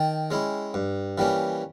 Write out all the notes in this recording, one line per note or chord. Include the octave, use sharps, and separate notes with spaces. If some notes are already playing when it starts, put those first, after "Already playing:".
Already playing: D#3 G5 A5
G#3 C#4 E4
G2
E3 G3 A#3 C#4